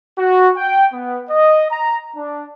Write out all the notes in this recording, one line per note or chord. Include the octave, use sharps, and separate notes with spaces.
F#4
G5
B3
D#5
A#5
D4